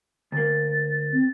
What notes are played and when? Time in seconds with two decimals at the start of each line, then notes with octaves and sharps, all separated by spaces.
0.32 D2 A#3 A6
1.13 C4